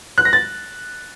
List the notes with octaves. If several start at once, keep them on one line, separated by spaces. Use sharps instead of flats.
F#6
A#6
A6